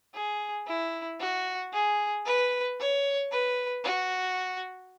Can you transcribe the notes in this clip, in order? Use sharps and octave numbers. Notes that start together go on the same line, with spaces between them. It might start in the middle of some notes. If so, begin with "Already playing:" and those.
G#4
E4
F#4
G#4
B4
C#5
B4
F#4